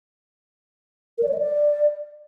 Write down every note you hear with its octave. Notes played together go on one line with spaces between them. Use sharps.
A#4
D5
C#5
D#5
D5